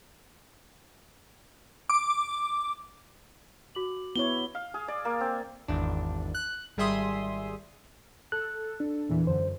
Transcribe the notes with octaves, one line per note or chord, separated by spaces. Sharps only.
D6
F#4 D6 F#7
B3 E4 C#5 G7
F5
G#4
D5
A#3
C4
G#1 E2 D4
F#6
G#1 G3 G#4 E5 C6 D#6
A4 F#6
D4
E2 A#2 E3
F#2 D3 C5